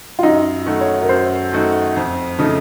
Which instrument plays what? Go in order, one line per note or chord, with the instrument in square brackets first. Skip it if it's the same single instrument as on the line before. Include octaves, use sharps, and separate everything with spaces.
[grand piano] F4
[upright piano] F#2 [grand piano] D#4
[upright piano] D#3 A3 D#4 F#4
[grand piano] C#5
A#4
[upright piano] F#2 [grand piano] C5
[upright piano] D#3 A3 D#4 F#4
F2
C#3 F3 A3 D#4